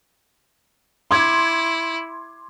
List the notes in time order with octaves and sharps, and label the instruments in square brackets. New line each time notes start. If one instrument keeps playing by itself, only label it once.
[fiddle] E4 [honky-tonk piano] C6 D6 G#6